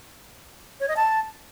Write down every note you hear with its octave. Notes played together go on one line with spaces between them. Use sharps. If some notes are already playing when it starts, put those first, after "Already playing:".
C#5
D#5
A5